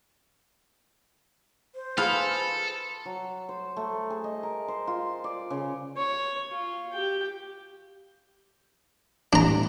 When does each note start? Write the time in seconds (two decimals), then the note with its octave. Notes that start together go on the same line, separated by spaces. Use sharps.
1.75 C5
1.97 F4 G#4 A4 B4 F5 A5
3.05 F#3
3.49 C5
3.76 A3
4.10 G#4
4.24 D#5
4.43 A#4
4.68 C5
4.87 F4
5.24 D5
5.50 C#3
5.97 C#5
6.51 F4
6.93 G4 G5
9.33 A2 E3 G3 D4 A#5